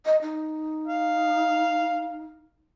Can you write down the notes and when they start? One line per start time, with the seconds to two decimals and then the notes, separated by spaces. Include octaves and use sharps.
0.05 D#5
0.22 D#4
0.87 F5